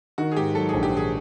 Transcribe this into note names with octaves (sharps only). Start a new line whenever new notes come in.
D#3 F#4
G#4
G#2 G4
F#3 A4
A#1 G#4
G4
D#3 G#4